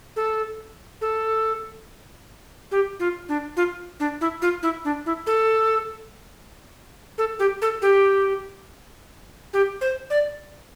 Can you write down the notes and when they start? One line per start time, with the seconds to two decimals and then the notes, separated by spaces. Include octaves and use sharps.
0.16 A4
1.01 A4
2.71 G4
3.00 F4
3.29 D4
3.57 F4
4.00 D4
4.21 E4
4.42 F4
4.63 E4
4.85 D4
5.06 E4
5.27 A4
7.18 A4
7.39 G4
7.62 A4
7.82 G4
9.53 G4
9.81 C5
10.10 D5